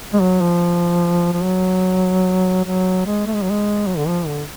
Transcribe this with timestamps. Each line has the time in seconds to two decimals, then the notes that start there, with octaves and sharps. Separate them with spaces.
0.13 G#3
0.21 F#3
0.41 F3
1.33 F3
1.43 F#3
2.65 F#3
3.06 G#3
3.26 A3
3.34 G#3
3.42 F#3
3.51 G#3
3.87 F#3
3.98 D3
4.08 F3
4.27 D3